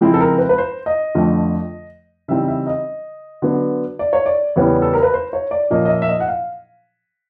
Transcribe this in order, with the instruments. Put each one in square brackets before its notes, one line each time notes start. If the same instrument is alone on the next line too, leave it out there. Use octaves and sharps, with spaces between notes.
[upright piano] C#3 F3 G#3 C4 E4
A4
A#4
B4
B4
C5
D#5
F2 D3 F3 A3
C#3 E3 G3 C4 D#4 E5
E5
D#5
D3 F#3 B3
D5
C#5
D5
E2 C#3 E3 G3 B3 C#5
A4
A#4
B4
C5
C#5
D5
A#2 F3 A#3 C#4 D#5
D#5
E5
E5
D#5
F#5
F5